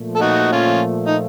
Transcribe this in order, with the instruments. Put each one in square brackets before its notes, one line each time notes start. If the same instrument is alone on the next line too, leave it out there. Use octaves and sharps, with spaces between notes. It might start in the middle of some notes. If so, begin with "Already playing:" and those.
Already playing: [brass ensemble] A#2 F3 A3
[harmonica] A4
D#4 F#4
C#4 F4
D#4